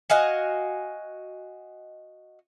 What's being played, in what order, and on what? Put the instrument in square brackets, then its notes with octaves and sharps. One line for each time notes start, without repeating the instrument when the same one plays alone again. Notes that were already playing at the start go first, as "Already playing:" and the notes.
[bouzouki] F#4 D#5 F5 G#5